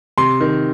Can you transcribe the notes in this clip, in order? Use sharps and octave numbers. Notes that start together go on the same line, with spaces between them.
C3 C6
D#3